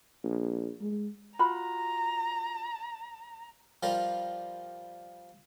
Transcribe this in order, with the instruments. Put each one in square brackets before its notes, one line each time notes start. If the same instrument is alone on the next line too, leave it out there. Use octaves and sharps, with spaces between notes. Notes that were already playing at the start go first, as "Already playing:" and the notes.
[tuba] A#1
G#3
[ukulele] F4 F#4 B5 [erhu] A#5
[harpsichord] F3 G3 F4 A#4